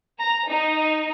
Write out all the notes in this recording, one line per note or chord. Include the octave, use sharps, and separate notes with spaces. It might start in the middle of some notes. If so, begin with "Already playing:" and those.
A#5
D#4